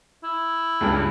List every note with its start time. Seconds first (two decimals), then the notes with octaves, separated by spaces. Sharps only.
0.23 E4
0.81 C#2 G2